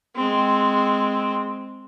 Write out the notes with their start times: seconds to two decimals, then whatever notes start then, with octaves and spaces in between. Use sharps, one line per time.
0.16 G#3 C4